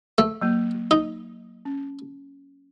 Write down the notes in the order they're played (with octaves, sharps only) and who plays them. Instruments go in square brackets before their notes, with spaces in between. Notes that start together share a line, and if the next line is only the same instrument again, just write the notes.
[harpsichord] A3
[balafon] F#3 A#3
[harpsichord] D#4
[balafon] C#4